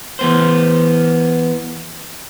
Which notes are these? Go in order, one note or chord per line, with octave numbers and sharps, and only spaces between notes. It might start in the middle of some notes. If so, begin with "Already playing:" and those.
E3 B3 C5